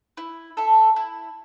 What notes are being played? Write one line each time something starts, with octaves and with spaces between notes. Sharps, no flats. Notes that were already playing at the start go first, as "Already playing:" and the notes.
E4
A4 E5
E4